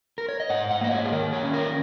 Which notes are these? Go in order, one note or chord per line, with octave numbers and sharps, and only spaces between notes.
A#4
C#5
D#5
G#2 F#5
F#5
A#3 D#5
C#5
G#4
D#3 A#4
C#5
C#4
A#4